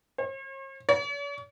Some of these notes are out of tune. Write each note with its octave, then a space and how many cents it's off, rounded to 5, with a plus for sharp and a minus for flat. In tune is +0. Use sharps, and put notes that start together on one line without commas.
C#5 -45
C#5 +45